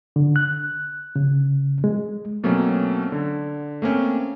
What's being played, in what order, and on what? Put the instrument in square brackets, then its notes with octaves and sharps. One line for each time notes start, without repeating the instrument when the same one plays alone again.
[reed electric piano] D3
F#6
C#3
G#3
[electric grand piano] B2 F#3 A3 A#3 C4 C#4
D3
A3 A#3 C4 C#4